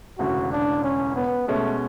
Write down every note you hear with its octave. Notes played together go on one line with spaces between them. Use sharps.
E1 D2 C#3 F#4
D4
C#4
B3
B2 G#3 A3 C#4